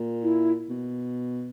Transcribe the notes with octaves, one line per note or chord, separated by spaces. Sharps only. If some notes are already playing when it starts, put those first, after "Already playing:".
Already playing: A#2
E4
B2